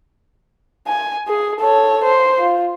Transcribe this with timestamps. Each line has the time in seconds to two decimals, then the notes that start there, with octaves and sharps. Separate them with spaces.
0.88 G#5
1.28 G#4
1.60 A4 C#5
2.04 C5
2.39 F4